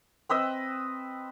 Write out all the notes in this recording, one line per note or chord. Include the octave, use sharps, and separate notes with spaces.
C4 B4 D#5 E6